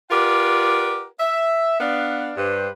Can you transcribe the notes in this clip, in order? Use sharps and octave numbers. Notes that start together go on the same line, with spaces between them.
F4 G4 A#4 B4 D5 F#5
E5
B3 D4 F5
G2 B4 C5